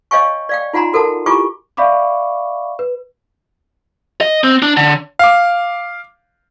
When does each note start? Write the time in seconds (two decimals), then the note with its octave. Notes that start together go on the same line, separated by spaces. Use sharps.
0.11 C#5 D#5 F5 G5 G#5 C#6
0.49 D5 F5 G5
0.73 D#4 F4 F#5 G#5 A#5 C6
0.93 F#4 A4 A#4 F#5 A5
1.26 E4 F4 G4 G#5 C#6 D6
1.77 D5 E5 F5 B5 C#6 D6
2.79 B4
4.21 D#5
4.44 C4
4.62 D4
4.77 D3
5.19 F5 D6